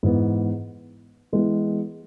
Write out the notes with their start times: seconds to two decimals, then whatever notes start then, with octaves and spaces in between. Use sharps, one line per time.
0.03 G#2 E3 B3
1.32 E3 G#3 B3